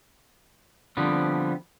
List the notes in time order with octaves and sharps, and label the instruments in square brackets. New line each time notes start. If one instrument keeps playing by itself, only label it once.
[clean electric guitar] D3 F3 G3 B3 C4